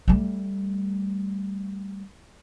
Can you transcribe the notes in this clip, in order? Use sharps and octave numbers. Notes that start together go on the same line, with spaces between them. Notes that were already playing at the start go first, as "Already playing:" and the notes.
G3 A3